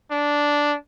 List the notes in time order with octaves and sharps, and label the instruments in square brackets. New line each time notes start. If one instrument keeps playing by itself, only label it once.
[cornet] D4